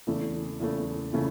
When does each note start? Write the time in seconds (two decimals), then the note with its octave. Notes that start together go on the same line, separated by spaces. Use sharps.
0.07 E2 C#3 E3 A3
0.60 E2 C#3 E3 A3
1.13 C#3 E3 A3